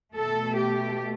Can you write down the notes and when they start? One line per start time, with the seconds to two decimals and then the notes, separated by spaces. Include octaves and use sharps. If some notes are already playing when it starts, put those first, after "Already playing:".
0.13 B2 A3 A4
0.56 G4